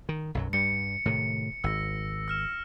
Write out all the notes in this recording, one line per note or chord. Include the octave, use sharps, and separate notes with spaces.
D#3
B1 F#2 F#3
G2 G3 C#7
A2 C3 D#3
G#1 E6 A#6
E6 F6 E7